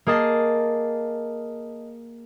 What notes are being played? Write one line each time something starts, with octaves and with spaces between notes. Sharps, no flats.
A#3 G#4 D#5 A5